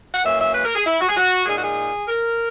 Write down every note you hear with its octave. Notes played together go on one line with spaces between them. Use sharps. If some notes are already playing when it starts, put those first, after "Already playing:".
F#5
F#2 E3 A#3 C#4 E5
E5
B4
A#4
G#4
E4
F#4
G#4
F#4
A#2 G#3 D#4 G#4
F#4
G#4
A#4